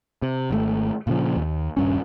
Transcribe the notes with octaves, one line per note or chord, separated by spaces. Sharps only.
C3
G#1 D3 A3
A#2 C#3 F3
D#2
D#1 G2 C#4